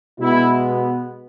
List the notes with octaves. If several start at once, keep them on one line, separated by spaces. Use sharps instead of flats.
B2 G#3 B3 E4